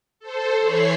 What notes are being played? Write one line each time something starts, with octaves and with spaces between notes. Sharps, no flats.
A4 C5
E3 C#5 B5 C#6 C7